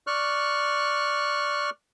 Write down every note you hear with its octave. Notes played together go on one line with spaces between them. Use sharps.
D5 C#6 F6 F#6